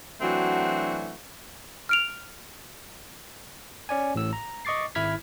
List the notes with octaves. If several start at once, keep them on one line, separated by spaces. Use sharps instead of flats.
E3 F#3 A3 C4 D4 F#4
F6 D7 F7
C#4 D5 G#5
A1 A2 E6
A#5
D#5 C#6 D6 A6 C7
G#1 E4 B5 F6 G#6 B6